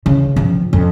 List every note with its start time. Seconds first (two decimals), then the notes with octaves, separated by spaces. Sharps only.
0.06 C#3 E3
0.36 G2 F3
0.73 F2